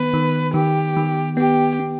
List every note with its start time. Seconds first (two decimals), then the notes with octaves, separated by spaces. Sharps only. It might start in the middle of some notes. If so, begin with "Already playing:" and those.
Already playing: D#3 B3 B4
0.14 D#3
0.54 D#3 G4
0.97 D#3
1.37 B3 G4
1.79 B3